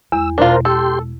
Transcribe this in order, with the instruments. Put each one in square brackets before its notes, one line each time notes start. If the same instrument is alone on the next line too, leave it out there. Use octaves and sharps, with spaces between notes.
[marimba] E2 [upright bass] G#3 [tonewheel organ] E6
[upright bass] B2 G#3 [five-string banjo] D4 F4 [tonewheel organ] A#4 C5
[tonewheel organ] G4 C6 [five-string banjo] A4